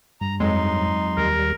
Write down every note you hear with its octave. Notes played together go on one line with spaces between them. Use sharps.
G2 A#5
F2 F#3 G#3 D#4 C6
D#2 G3 A#4